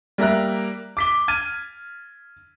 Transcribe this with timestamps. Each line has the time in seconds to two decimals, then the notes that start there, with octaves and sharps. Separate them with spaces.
0.18 G3 A#3 E5 A#5 F#6
0.97 D6 B6 G7
1.28 F6 G#6 A6 D#7